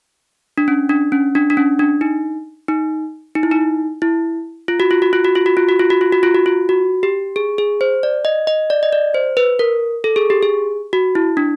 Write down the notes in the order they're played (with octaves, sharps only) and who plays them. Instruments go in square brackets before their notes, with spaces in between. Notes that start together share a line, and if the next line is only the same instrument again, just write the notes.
[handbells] D4
C#4
D4
C#4
D4
D4
C#4
D4
D#4
D#4
D#4
E4
D#4
E4
F4
F#4
F4
F#4
F4
F#4
F4
F#4
F4
F#4
F4
F#4
F4
F#4
F4
F#4
F4
F#4
G4
G#4
G#4
C5
D5
D#5
D#5
D5
D#5
D5
C5
B4
A#4
A4
G#4
G4
G#4
F#4
E4
D4